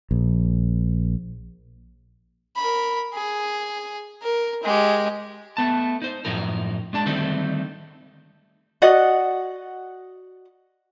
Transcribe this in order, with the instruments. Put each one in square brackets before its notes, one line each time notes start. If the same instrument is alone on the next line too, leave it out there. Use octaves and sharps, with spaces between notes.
[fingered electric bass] A#1
[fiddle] A#4 B5
G#4
A#4
G#3 G4
[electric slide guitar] A3 B3 A5
D#4 C5
F#2 A2 F3 D#4 A#4
G#3 D4 A5
D3 D#3 G3 A3 C4 D#4
[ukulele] F#4 D5 D#5 F#5